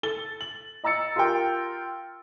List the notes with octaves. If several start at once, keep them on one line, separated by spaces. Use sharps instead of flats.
A4 A6 G7
F#7
D#5 A#5 E6 A6 C#7
F4 G4 A#4 G5 C6